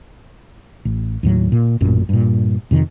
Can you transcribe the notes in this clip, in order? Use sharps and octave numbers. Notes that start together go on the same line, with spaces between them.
A1
D#2 A2 F#3
A#2
A1 F#2 A#2
G2 A#2
F2 C3 D#3